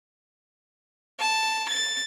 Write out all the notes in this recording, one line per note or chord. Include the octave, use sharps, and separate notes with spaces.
A5
A6